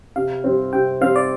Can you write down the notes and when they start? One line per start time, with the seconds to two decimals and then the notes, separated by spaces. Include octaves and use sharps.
0.16 C3 F5
0.44 G3 C4
0.73 C3 G5
1.01 G3 C4 F5
1.16 D5